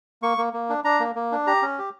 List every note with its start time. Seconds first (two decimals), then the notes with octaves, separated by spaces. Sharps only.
0.22 A#3 C#6
0.38 A#3
0.53 A#3
0.69 D4
0.84 D4 A#5
1.00 A#3
1.15 A#3
1.32 D4
1.47 G4 A#5
1.62 C#4
1.79 G4